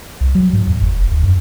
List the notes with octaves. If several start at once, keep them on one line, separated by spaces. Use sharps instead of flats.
C2
F#3
G#2
E2
G1
F1
D#2
F#2